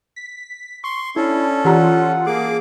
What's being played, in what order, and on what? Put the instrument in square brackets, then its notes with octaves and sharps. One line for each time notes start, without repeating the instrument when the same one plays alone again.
[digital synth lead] B6
[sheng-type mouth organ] C6 [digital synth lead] C#6
[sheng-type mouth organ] C#4 A4 [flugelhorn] D4 [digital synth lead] E4
[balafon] E3 G4 A#5 [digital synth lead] F4 [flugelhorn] F#5
[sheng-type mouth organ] A#3 D6 [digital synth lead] G#4